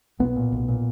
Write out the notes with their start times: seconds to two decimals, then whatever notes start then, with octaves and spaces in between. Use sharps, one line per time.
0.19 B1 B3
0.36 A#2
0.52 B1
0.68 A#2